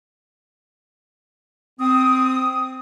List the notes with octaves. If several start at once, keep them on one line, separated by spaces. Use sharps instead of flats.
C4 D#6